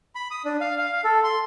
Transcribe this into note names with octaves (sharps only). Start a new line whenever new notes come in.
B5
D#6
D4
F5
F5
F5
A4
C6